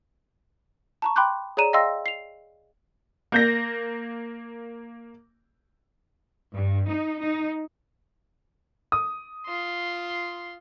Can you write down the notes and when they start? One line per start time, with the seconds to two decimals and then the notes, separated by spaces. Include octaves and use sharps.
1.02 A5 A#5 C#6
1.16 G5 B5 C6 D6 F#6 G6
1.57 G#4 C#5 D5 A#5 D#7 E7
1.73 D#5 F5 G5 C6 E6 A#6
2.06 C7 F7
3.32 A#3 G6 A#6
6.54 G2
6.88 D#4
7.20 D#4
8.92 D#6
9.46 F4 C6